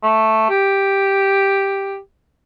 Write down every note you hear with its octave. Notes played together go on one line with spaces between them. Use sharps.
A3
G4